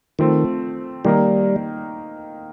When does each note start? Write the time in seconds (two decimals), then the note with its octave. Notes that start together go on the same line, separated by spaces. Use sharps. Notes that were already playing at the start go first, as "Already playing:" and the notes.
0.19 D#3 F3 A3 C4
1.05 D#3 G3 A#3 D#4